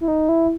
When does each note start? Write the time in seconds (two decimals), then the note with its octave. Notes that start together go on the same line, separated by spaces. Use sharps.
0.01 E4
0.08 D#4
0.29 E4